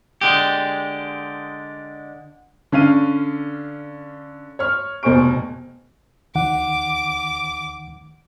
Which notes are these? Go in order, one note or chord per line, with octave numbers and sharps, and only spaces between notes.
D3 G#3 G4
D3 C#4 F5 D#7
C#5 F6
F1 B2 C5 G#5 C#6 D7
D2 D#3 F#5 D6